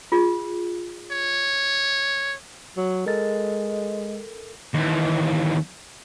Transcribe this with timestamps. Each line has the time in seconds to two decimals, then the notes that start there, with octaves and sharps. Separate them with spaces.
0.12 F4 G#4
1.12 C#5
2.77 F#3
3.06 G#3 A4 A#4 A6
4.74 D#2 E3